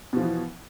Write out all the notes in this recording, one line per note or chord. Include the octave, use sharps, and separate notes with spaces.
B2 E3 F3